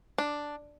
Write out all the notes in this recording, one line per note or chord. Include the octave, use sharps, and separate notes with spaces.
D4